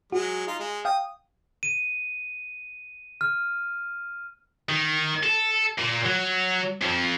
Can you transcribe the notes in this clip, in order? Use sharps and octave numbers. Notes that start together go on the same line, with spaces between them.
F#3 G#3 F#4
D#4 F4
G#3
F5 G5 D#6
D#7
F6
D#3
A4
A#2
F#3
F2 F3